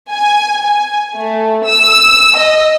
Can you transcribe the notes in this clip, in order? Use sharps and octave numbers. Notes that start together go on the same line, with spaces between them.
G#5
G#5
A3
E6
D#5